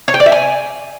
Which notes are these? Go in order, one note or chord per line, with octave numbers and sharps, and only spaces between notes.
C#5
G5
D5
E5
G#5